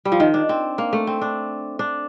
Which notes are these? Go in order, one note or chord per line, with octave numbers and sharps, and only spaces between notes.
G3
F3
D#3
D4
C4
A#3
A3
C4
D4
D4